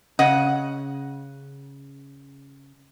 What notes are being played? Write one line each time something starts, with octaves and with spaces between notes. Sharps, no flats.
C#3 D#5 F#5